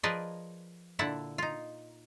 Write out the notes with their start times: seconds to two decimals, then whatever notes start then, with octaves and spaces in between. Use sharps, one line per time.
0.03 F3 G#4 A#4 B4 D5 D#5
0.99 A#2 D3 E4 F#5 A5
1.38 D#4 F4